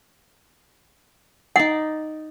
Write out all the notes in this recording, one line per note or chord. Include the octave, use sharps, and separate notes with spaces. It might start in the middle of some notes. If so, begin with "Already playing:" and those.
D#4 D5 F#5